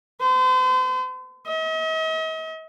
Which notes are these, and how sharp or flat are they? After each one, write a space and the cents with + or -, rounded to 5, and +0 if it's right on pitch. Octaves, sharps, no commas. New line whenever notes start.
C5 -40
D#5 +45